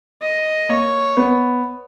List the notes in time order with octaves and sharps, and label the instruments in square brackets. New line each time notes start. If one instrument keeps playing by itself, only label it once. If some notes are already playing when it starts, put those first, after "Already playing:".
[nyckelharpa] D#5
[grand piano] A#3 [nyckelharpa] C#5
[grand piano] B3